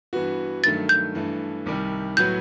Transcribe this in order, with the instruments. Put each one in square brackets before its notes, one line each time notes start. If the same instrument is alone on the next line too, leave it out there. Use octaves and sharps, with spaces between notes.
[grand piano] G2 E3 B3 F#4
[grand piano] G2 D#3 F#3 A3 [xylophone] A6
[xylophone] G6
[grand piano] G2 E3 A3
C2 C3 D#3 G3
[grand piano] A2 F#3 B3 F#4 B4 [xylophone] G6